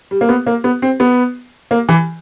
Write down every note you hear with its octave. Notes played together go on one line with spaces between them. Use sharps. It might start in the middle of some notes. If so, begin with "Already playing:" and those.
G3
A#3
B3
A#3
B3
C4
B3
A#3
E3